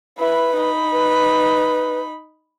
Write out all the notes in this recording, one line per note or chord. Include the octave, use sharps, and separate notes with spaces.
E4 B4 B5
D#4 B5
B4